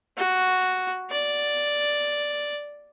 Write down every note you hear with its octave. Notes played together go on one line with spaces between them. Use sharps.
F#4
D5